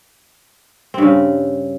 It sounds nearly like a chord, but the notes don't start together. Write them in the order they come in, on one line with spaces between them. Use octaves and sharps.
C4 G2 C#3